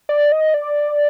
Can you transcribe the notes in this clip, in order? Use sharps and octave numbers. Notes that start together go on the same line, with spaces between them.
D5
D#5
D5